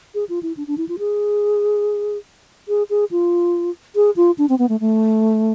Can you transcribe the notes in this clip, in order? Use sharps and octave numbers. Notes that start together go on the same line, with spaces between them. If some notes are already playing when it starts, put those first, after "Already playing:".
G#4
F4
E4
D4
D4
E4
F4
G#4
G#4
G#4
F4
G#4
F4
D4
C4
B3
A3
A3